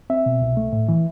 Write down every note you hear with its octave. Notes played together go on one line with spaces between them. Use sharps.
C4 E5
B2
C2
A3
A2
E3